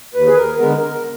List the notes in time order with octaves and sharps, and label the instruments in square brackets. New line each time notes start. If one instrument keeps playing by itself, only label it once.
[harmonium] D#2 B4
G#4
A#4
D3 G#3 B3 A#4
A#4